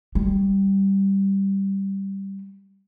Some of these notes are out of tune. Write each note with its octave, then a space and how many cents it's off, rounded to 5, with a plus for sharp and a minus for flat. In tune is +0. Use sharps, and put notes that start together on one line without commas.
G3 -5